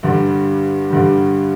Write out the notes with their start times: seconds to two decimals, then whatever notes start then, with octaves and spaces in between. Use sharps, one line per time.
0.03 G2 D3 G3
0.90 G2 D3 G3